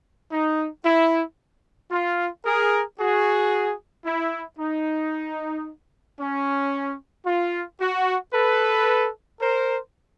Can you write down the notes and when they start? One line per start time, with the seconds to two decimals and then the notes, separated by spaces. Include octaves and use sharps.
0.31 D#4
0.84 E4
1.91 F4
2.45 G#4 A#4
2.99 F#4 G#4
4.05 E4
4.59 D#4
6.20 C#4
7.26 F4
7.80 F#4
8.33 A4 B4
9.41 A#4 C5